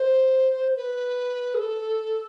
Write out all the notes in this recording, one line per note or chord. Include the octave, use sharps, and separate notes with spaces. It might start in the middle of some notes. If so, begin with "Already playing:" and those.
Already playing: C5
B4
G#4
A4